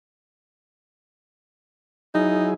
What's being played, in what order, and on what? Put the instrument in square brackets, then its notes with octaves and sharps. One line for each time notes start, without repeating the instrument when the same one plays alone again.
[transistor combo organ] F#3 E4 G#4 [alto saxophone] D#4